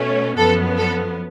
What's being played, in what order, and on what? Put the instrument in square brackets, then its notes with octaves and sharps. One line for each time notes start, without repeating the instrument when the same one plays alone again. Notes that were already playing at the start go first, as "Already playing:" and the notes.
Already playing: [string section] B2 A3 C#4
F#2 F3 B3 A4
A4